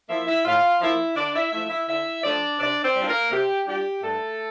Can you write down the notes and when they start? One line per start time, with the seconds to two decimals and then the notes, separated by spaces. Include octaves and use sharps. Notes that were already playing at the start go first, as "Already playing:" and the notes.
0.09 F3 A#3 E4 E5
0.27 E4 E5
0.45 A2 F4 F5
0.81 F3 A#3 E4 E5
1.16 D3 D4 D5
1.34 E4 E5
1.52 F3 A3 E4 E5
1.70 E4 E5
1.88 D3 E4 E5
2.24 F3 A3 D4 D5
2.59 C3 D4 D5
2.83 C4 C5
2.95 G3 D4 F4
3.08 A#3 A#4
3.31 C3 G4
3.67 G3 D4 F4 G4
4.02 G2 A3 A4